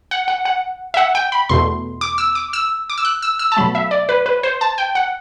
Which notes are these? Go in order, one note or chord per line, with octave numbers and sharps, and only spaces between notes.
F#5
F#5
F#5
E5
F#5
G5
B5
E2 B2 A3 C6
D6
E6
D6
E6
D6
E6
F#6
E6
E6
A5
B2 F#3 A3 B5
E5
D5
B4
B4
C5
A5
G5
F#5